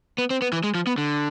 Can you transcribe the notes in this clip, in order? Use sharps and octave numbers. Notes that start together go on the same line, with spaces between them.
B3
C4
B3
E3
G#3
F3
B3
D3